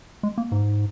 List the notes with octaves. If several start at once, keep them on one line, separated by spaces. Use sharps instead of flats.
G#3
A#3
G#2